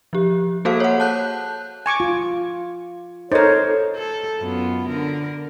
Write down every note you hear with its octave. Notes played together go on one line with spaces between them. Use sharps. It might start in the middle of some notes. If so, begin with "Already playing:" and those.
F3 G4
A#3 F#4 G#4 A4 C5 F5
C#5 F#5
A5 F#6 G6
G#5 C#6 D6
F4
D#4 A4 A#4 C5 C#5
A4
F#2 B3 F4
D3 A#4